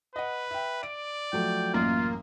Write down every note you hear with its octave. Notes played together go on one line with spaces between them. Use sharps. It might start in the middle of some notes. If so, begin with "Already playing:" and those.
B4 D#5 F#5
E5 G5
D5 D7
F3 F#3 A3 G5
A1 F#2 A#3 F4